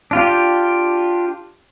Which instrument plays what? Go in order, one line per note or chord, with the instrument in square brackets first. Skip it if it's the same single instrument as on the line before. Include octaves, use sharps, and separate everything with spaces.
[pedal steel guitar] D4 F4 G4